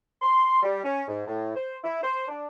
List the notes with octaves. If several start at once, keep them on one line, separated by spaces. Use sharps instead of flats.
C6
G3
C#4
G#2
A2
C5
E4
C5
D4